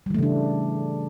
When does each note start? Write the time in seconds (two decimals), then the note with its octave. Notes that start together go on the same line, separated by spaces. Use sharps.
0.06 G3
0.10 E3
0.14 A3
0.19 C#3
0.23 D4